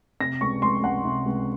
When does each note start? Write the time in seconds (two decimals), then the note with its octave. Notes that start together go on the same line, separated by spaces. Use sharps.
0.20 C3 A#6
0.41 C#2 C#6
0.62 C#2 C6
0.83 C#2 F#5
1.05 C3
1.26 C#2